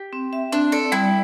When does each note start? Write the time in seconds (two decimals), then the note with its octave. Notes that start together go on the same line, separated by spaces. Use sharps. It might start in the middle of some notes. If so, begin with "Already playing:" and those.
Already playing: G4
0.13 C4
0.33 E5
0.52 C4 D4
0.72 A4 D5
0.92 G3 E4